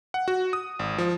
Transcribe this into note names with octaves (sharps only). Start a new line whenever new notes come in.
F#5
F#4
D#6
G#1
F3